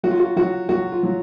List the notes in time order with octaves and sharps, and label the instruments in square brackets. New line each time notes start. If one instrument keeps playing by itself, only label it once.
[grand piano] F#3 F#4
F4
F#4
F#3 F#4
F#3 F#4
F4
F#3